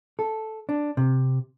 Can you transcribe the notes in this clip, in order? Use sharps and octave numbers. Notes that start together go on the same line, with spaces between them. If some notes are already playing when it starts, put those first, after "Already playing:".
A4
D4
C3